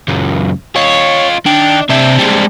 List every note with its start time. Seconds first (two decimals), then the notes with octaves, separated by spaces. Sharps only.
0.08 C#2 F#2
0.76 F4 C#5 D#5
1.46 D#3 D4
1.90 C3 C4 D4 E5
2.19 G3 G#3